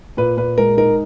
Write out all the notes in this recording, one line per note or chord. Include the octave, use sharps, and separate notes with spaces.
A#2 B4
A#2 B4
G#3 A#4
D#4 A#4